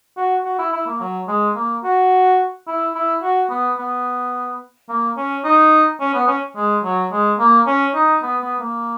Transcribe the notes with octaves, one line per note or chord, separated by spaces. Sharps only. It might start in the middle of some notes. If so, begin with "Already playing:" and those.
F#4
F#4
E4
E4
A#3
F#3
G#3
A#3
F#4
E4
E4
F#4
B3
B3
A#3
C#4
D#4
C#4
B3
C#4
G#3
F#3
G#3
A#3
C#4
D#4
B3
B3
A#3